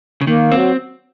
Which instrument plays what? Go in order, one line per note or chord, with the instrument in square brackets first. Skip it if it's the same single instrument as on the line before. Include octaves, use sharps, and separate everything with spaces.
[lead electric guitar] C#3
[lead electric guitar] D#3 [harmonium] A#3
[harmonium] F#3 [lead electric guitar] C4